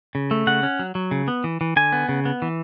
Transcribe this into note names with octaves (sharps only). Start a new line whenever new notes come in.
C#3
A3
C#3 F#5
C#4
F#3
F#3
C#3
B3
E3
E3
D3 G#5
B3
C#3
B3
E3